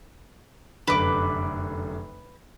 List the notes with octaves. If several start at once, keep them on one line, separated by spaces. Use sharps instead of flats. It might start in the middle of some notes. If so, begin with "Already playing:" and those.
F1 F#2 D3 B4 D6